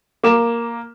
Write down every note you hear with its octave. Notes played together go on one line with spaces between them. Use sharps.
A#3 D6 E7